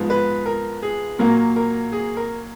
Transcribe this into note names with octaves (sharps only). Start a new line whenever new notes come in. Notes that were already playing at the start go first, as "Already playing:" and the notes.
Already playing: G#2 F3 B3
B4
A#4
G#4
A#2 F#3 A#3 A#4
A#4
G#4
A#4